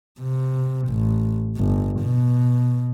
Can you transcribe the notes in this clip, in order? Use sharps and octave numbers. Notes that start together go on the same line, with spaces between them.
C3
A1
G1
B2